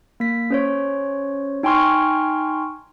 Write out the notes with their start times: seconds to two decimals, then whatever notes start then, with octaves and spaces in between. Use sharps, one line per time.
0.20 A#3 B6
0.50 C#4 C5 C#5
1.63 D#4 G5 G#5 C6 C#6 F6